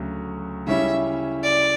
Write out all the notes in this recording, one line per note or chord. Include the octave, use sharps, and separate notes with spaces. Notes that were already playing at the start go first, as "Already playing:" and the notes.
Already playing: D2 C#3 F#3
C#3 G3 C#4 E4 E5
D5